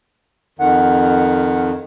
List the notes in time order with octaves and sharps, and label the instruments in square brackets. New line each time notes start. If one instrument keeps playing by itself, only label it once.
[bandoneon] F2 D#3 [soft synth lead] F#5